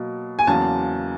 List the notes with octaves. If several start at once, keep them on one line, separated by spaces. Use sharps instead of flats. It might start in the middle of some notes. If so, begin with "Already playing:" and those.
Already playing: B2 F#3 A#3
G#5
E2 C#3 F#3 A#3 A5